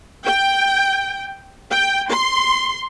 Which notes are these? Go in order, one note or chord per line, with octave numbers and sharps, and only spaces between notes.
G5
G5
C6